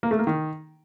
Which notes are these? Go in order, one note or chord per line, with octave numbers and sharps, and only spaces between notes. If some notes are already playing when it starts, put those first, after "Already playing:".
A#3
A3
A#3
D#3